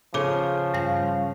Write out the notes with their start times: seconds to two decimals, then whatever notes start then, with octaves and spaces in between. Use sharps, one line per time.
0.14 C#3 F3 A4 D6
0.74 G2 G3 F5 A#6